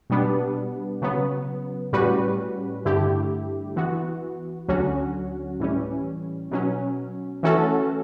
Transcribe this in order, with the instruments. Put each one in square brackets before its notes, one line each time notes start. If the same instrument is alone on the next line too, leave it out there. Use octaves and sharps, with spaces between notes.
[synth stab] B2 G3 B3 D4
C#3 F#3 B3
A2 G3 C#4 F#4 B4
G2 D3 A3 E4 G4
E3 B3 F#4
D2 D3 F#3 C#4 F#4
A2 E3 G3 C#4
B2 F#3 C#4
E3 A3 C#4 F#4 A4